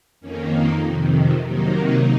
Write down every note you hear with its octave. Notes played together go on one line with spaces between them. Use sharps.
F2 D#3 A#3 C#4
D#4
F2 C3 D#3
C3 D#3 F#3 A#3 D#4
D#4